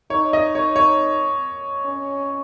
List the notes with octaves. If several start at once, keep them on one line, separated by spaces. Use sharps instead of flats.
D#4 C#5
D#5
C#5
C#5
C#4